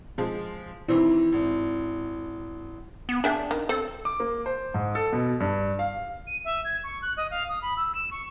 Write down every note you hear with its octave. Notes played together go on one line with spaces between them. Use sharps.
F3 G#3
D#3 E3 C4 E4
G#1
B3
D4 G#4 E5 G5
D#3
C4 A4
D6
A#3
C5
G#2
A4
B2
G2
F5
D#7
E5
G#6
C#6
F#6
D#5
F5
D#6
B5
E6
E7
C#6